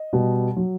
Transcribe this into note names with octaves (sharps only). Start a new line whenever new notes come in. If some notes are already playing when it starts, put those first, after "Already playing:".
Already playing: D#5
B2 G3
F#3